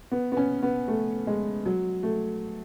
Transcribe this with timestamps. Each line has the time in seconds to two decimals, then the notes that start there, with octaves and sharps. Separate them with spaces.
0.11 B3
0.32 B3
0.37 C#4
0.63 B3
0.88 A3
1.27 G#3
1.66 F#3
2.03 A3